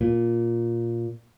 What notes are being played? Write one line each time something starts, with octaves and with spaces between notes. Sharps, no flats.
A#2